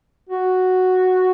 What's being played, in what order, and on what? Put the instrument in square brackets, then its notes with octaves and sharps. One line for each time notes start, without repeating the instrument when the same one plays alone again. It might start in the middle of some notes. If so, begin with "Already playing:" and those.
[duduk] F#4